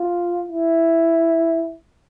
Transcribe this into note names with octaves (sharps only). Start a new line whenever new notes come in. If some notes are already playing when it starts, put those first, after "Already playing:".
Already playing: F4
E4